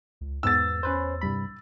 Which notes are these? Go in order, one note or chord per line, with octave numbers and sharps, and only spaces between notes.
C#2
E2 G#2 B3 E6 A6
C#4 B4 C5
C2 G2 B5